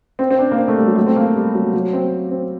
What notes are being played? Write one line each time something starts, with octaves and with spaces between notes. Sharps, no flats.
C4
C4
D4
A#3
C4
A3
G3
F#3
A3
C4
A#3
G3
F#3
F#3
C4
C4